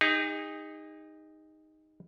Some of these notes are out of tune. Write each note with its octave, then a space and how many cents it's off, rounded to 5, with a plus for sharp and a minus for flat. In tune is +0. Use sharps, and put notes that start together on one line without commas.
D#4 +0 G#4 -45